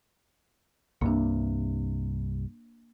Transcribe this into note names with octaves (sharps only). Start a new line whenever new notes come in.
C2 G2 C3 A#3 D4